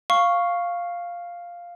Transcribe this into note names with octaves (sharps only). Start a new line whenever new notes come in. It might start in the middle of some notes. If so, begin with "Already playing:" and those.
F5 C#6